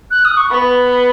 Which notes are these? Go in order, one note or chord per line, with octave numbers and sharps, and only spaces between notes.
F#6
D#6
C#6
B3 B5